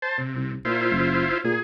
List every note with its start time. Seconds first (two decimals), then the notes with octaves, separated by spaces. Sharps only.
0.02 C5 A5
0.18 C3
0.35 C2
0.65 A#2 E4 F4 C5
0.91 F#1
1.44 A#2 G#4